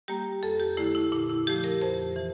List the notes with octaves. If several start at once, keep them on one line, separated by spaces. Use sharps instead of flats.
G3 A#3 G4
F2 A4
G4
D3 A3 E4
E4
A#2 E4
E4
F3 A3 G4
A#4
F2 C5
E3